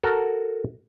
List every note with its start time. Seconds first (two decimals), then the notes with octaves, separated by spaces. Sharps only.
0.03 F#4 A4 A#4